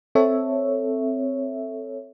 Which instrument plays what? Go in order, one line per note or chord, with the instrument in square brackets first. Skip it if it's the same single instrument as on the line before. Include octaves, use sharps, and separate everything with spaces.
[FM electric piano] C4 A4 C#5 E5